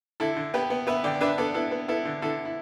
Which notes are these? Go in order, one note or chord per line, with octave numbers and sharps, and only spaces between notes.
D3 E4 A4
D3
B3 G4 B4
B3
B3 B4 E5
D3 D5 G5
D4 B4 E5
B3 A4 D5
B3 E4 A4
B3
B3 E4 A4
D3
D3 E4 A4
E4